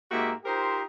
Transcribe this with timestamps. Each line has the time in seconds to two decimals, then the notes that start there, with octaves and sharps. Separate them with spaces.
0.11 G#2 A#3 D#4 F#4 G4 E5
0.45 D#4 F4 G4 A#4 C5